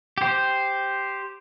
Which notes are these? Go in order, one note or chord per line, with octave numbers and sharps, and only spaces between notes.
G4 C5